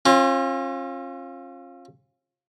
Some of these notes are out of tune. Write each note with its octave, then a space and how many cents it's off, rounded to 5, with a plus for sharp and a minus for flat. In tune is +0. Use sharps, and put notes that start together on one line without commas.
C#4 -45 F4 +10